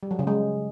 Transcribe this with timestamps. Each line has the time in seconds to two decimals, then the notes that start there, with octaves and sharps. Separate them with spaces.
0.03 G3
0.11 F#3
0.19 C#3
0.27 G#3